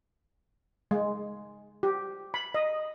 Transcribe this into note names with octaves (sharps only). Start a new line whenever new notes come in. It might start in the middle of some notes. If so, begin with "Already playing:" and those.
G#3
G4
B5
D#5